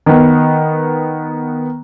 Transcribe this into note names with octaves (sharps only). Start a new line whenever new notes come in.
D#3 B3